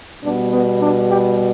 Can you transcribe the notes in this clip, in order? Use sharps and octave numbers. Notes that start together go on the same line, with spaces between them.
B2 G3 B3 D4
B3
D4
G4